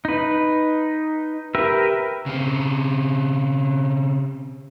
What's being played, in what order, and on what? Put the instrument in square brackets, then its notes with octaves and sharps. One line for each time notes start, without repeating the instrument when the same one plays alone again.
[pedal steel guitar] D#4 B4
G4 A#4 B4 E5
[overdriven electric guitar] C#3 C4